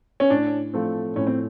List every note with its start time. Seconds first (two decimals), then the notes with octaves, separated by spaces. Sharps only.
0.20 C#4
0.30 A2 D4
0.74 F3 A3 C4
1.16 A2 C#4
1.27 C4